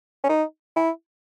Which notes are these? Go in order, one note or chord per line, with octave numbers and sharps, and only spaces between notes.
C#4
D#4
E4